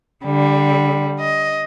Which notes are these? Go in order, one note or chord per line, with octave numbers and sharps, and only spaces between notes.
D3 G3
D#5